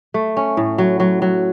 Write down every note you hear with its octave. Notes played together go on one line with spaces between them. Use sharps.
A3
C#4
A2
F#3
F#3
F#3